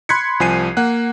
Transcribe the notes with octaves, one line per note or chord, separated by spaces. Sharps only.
B5 C6 F#6 G#6 B6 C#7
C2 F3 G#5 C7 D#7
A#3 F#5 F#6